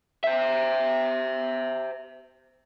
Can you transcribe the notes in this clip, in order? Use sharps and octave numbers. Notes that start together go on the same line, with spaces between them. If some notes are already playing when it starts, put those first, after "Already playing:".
C5 E5